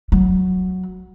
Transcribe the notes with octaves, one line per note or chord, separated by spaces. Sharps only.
F#3